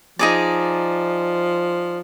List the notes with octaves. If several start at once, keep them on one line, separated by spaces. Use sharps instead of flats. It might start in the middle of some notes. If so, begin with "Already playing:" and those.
F3 D#4 G#4 D5